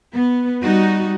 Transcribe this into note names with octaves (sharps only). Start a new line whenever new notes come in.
B3
G3 D#4 F#4